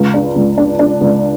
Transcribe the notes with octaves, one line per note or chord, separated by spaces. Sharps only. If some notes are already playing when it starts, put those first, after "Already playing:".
Already playing: C#2
D4
C#2
D4
D4
C#2